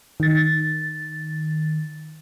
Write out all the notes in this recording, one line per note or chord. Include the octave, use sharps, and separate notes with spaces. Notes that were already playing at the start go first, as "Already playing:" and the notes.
D#3 A6